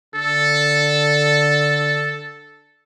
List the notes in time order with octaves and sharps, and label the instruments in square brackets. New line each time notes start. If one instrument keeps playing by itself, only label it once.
[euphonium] D3 [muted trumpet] A4